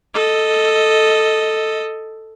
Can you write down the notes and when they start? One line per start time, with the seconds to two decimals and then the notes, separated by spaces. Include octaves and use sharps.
0.14 A4 D#5